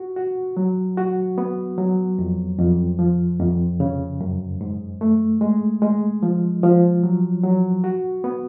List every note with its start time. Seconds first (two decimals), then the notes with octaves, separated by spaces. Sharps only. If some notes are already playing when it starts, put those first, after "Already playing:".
Already playing: F#4
0.16 F#4
0.57 F#3
0.97 F#4
1.38 B3
1.78 F#3
2.18 F2
2.58 F2
2.99 F3
3.40 F2
3.80 C#3
4.20 F#2
4.61 G#2
5.01 A3
5.41 G#3
5.82 G#3
6.23 F3
6.63 F3
7.03 F#3
7.43 F#3
7.84 F#4
8.24 B3